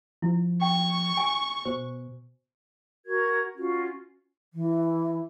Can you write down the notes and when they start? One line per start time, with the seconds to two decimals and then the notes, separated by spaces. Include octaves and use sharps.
0.22 F3 E4
0.61 G5 C#6
1.17 G#5
1.65 B2 C5
3.05 F#4 A#4 G#6
3.54 C#4 F4 F#4
4.54 E3